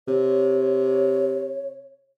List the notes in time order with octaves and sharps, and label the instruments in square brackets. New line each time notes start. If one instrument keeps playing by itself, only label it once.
[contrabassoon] C3 [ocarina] C#5